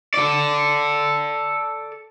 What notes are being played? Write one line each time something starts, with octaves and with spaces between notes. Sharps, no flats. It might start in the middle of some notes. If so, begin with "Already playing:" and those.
A4 D5